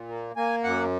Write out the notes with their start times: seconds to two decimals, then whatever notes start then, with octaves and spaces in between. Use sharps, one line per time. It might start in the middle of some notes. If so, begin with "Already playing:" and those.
Already playing: A#2
0.09 A#3
0.36 A#3 G#5
0.64 F#2 F#5